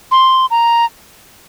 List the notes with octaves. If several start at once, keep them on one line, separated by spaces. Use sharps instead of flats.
C6
A#5